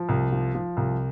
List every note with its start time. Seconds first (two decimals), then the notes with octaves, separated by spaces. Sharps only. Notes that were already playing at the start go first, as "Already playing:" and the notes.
Already playing: F3
0.09 C2
0.32 F3
0.55 F3
0.77 C2